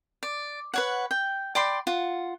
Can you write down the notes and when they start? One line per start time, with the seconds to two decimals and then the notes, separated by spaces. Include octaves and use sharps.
0.23 D5
0.74 B4 C#5 F#5
1.11 G5
1.55 D5 G5 B5 C6
1.87 F4 F#5